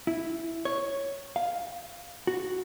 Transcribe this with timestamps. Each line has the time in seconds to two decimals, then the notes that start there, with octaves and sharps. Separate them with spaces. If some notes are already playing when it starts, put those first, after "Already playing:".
0.07 E4
0.65 C#5
1.36 F5
2.27 F#4